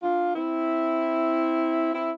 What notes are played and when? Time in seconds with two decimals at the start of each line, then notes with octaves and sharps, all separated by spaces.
0.03 D4 F4
0.34 C4 E4
1.94 C4 E4